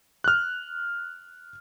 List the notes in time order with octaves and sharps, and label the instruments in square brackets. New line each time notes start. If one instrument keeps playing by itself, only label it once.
[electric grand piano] F6 F#6